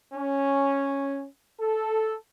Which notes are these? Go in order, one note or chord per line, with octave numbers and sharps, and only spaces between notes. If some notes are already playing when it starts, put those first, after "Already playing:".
C#4
A4